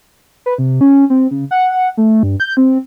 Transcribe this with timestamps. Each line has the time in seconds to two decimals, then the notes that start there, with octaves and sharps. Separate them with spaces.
0.46 B4
0.58 C3
0.81 C#4
1.10 C4
1.31 C#3
1.51 F#5
1.97 A3
2.23 G2
2.40 G6
2.57 C4